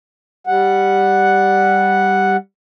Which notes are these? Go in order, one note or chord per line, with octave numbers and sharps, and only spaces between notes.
G3 F#5